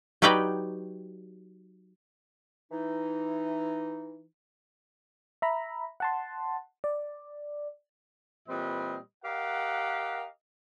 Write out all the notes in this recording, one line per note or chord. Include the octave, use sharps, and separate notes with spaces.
F#3 D#4 G4 B4 D5 G5
E3 D#4
E5 A#5 B5
F#5 A5 C6
D5
A#2 E3 G3 C4 B4 D#5
G4 A#4 D#5 F5 F#5